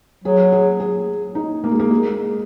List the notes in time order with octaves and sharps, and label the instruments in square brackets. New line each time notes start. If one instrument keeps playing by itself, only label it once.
[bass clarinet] F#3 [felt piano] G#4
[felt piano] G#4
G#4
D#4
A#3
G#3
A#3
G#3